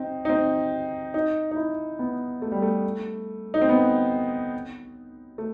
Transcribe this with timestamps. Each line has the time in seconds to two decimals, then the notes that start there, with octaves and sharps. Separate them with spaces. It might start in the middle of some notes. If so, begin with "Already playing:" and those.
Already playing: C4 D#4
0.25 D#4
0.29 C4
1.14 D#4
1.51 D#4
1.56 E4
1.99 B3
2.42 A3
2.52 G3
2.62 A3
3.54 D#4
3.61 C4
3.69 B3
5.38 A3